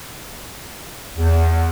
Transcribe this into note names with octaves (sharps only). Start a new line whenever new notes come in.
E2